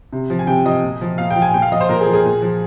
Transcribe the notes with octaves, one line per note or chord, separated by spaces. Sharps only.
C3
F3
G#5
C3 G5
F3 D#5
A#2
F3
A#2 F5
G5
F3
G#5
A#2 G5
F5
F3 D#5
C5
A#2 A#4
G#4
F3
G#4
A#2
F3